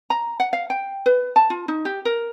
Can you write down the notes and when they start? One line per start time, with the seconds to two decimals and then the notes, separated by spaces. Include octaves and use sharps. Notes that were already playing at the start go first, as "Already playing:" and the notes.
0.10 A#5
0.40 F#5
0.53 F5
0.70 G5
1.06 B4
1.36 A5
1.50 F4
1.68 D#4
1.85 G4
2.05 A#4